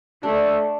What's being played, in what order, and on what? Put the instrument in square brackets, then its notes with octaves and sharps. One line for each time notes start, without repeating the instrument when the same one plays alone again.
[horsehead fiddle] A3 [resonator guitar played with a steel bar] D4